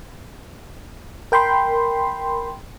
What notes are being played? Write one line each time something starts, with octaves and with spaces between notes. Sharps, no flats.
A#4 G5 B5 C6